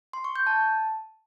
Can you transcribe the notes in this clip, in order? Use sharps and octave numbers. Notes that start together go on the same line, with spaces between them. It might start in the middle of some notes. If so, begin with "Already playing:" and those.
C6
C#6
G6
A5